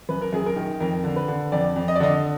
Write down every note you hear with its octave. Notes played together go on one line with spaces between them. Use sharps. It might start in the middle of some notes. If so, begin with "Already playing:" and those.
F#2 B4
A#4
F#2 G#4
A#4
D#3
F2 A#4
D3
B4
D3
F2 D5
F2
D#5
D5
D3 D#5